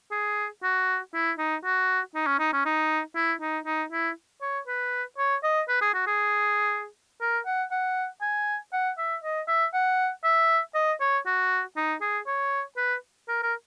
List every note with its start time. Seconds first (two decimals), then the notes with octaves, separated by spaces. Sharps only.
0.11 G#4
0.63 F#4
1.14 E4
1.38 D#4
1.64 F#4
2.15 D#4
2.27 C#4
2.39 D#4
2.53 C#4
2.65 D#4
3.15 E4
3.41 D#4
3.66 D#4
3.92 E4
4.42 C#5
4.68 B4
5.18 C#5
5.43 D#5
5.69 B4
5.82 G#4
5.94 F#4
6.07 G#4
7.21 A#4
7.46 F#5
7.71 F#5
8.21 G#5
8.73 F#5
8.98 E5
9.23 D#5
9.48 E5
9.74 F#5
10.24 E5
10.75 D#5
11.00 C#5
11.26 F#4
11.76 D#4
12.01 G#4
12.27 C#5
12.77 B4
13.28 A#4
13.42 A#4